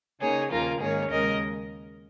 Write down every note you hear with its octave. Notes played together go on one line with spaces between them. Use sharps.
C#3 A#3 D#4 G#4 C#5
D#2 C#3 F3 A#3 F4 A#4
G#2 D#3 A#3 C#4 G#4 C#5
D#2 C#3 G#3 A#4 D#5